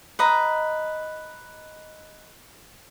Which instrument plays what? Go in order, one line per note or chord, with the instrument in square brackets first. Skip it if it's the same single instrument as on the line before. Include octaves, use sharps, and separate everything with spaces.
[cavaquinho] B4 D#5 A#5